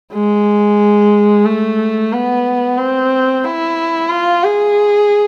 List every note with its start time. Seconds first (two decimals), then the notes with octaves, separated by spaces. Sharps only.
0.14 G#3
1.46 A3
2.13 B3
2.78 C4
3.44 E4
4.10 F4
4.44 G#4